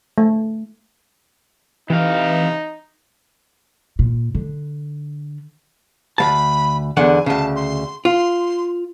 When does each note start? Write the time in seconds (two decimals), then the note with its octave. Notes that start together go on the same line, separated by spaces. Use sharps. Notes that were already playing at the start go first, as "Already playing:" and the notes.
0.18 A3
1.90 C3 E3 D#4 F5
3.99 A#2
4.35 D3
6.18 D2 F#3 A5 B5
6.97 E2 D3 F#5 G#5
7.26 D2 C#3 A5
7.55 C6
8.05 F4 C6